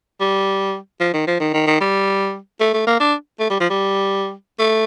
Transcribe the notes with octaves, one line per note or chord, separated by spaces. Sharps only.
G3
F3
D#3
F3
D#3
D#3
D#3
G3
A3
A3
A#3
D4
A3
G3
F3
G3
A3